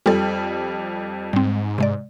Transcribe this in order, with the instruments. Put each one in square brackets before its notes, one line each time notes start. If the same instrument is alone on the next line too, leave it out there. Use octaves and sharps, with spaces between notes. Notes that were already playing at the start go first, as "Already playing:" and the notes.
[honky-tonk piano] F2 G3 [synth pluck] F4 A4
[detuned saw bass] G#2 [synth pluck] G3 C4
[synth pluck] C3 G#3 D5